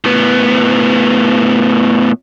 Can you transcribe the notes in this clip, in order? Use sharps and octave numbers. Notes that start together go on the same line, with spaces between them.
A2 B3